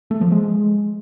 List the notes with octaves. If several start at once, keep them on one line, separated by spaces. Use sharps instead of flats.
A3
F3
G#3